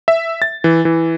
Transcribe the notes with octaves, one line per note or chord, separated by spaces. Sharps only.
E5
A6
E3
E3